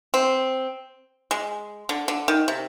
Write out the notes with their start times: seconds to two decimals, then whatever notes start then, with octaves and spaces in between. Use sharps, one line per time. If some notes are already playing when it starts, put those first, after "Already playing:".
0.14 C4
1.31 G#3
1.89 D3
2.08 D3
2.28 D#3
2.48 C3